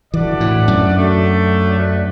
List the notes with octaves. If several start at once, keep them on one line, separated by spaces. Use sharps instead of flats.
E3 A3 D4 F#4 B4 D5
A2
F#2
F#3 A3 D4
F#3 D4 B4 D5